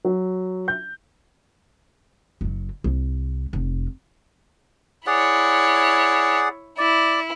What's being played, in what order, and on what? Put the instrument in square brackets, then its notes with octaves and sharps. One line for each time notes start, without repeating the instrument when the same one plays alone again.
[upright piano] F#3
G6
[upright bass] F#1 F#3
C2
F1
[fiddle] E4 C#5 [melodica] G#4 D5 F#5
[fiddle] E4 [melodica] D5